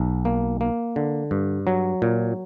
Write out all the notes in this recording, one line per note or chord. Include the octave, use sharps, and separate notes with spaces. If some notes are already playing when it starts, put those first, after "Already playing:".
Already playing: B1
A#3
A#3
D3
G2
F#3
A#2